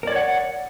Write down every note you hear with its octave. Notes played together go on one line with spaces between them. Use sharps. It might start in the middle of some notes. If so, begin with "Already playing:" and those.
A#4 C#5 D5 F#5